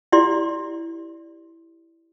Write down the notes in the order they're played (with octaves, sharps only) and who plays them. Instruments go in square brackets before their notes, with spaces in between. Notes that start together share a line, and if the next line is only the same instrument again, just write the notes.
[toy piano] E4 G4 D5 C6